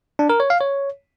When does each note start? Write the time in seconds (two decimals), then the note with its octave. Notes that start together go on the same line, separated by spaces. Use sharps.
0.19 D4
0.29 A#4
0.40 C#5
0.50 F5
0.61 C#5